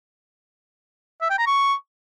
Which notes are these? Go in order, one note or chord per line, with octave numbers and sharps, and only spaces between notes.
E5
G5
A#5
C#6